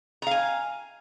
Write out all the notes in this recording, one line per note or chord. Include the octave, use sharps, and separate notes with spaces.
F5 G#5 A#5